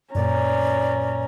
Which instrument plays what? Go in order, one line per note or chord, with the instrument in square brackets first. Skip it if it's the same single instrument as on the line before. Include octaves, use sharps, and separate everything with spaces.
[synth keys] F#2 A#2 [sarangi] C#4 [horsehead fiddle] B4 A#5 [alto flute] D5